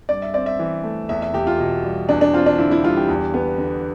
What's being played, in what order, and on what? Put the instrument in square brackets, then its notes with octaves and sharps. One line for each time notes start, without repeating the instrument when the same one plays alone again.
[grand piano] G2 D5
E5
C4 D5
E5
E3
A3
E2 E5
E5
E2 G4
F4
B2
G3
E2 D4
D4
C4 F4
D4
D3 E4
E4
G3 F4
G4
E2
B3
D3